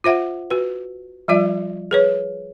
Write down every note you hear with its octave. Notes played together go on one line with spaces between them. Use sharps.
F4 C5 E5 F#5
F#4 B4
F3 G3 F4 D5 E5
G#4 B4 C#5